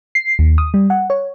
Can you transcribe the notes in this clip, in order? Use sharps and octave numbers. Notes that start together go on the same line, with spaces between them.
C7
D#2
D#6
G3
F#5
C#5